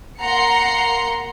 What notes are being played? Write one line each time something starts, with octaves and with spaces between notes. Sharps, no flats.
A#3 F#5 A#5 C6 C7 C#7